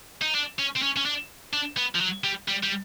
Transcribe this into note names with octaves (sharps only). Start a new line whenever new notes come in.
D#4
D4
C#4
C4
C#4
C#4
D4
D4
B3
F3
F#3
G3
G3
G3